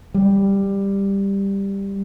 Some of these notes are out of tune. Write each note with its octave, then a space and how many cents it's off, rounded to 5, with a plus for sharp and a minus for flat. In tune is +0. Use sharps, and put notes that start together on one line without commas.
G3 +10